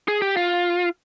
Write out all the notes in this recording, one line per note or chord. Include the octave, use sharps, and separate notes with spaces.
G#4
G4
F4